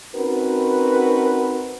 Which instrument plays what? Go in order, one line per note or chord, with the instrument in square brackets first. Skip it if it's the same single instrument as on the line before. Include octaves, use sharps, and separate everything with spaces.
[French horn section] C4 C#4 D#4 F#4 A#4 B4